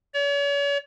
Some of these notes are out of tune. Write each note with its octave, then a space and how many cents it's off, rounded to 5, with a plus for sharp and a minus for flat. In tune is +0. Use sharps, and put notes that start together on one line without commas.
C#5 +40